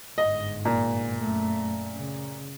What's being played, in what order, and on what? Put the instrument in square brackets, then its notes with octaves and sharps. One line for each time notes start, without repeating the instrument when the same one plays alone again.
[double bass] G1 G#2 [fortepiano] D#5
[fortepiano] A#2
[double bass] F#2 A3
C#3